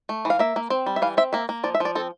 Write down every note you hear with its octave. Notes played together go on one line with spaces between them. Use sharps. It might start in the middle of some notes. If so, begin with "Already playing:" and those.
A3
E3
F5
A#3 E5
A#3
C4
G3
E5
E3 F5
C4 E5
A#3 E5
A#3
F3 D5
E5
F3 D5
C4 A4